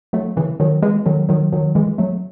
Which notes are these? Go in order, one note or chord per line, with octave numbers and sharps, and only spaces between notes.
F#3 A3
C#3 E3
D#3 F#3
E3 G#3
D#3 F#3
D#3 F#3
D#3 F#3
E3 G#3
F#3 A3